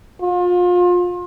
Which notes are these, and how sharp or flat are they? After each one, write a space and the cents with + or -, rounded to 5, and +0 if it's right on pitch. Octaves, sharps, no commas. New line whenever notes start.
F4 +30